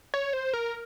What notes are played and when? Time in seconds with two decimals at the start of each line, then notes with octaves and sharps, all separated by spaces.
0.14 C#5
0.33 C5
0.53 A#4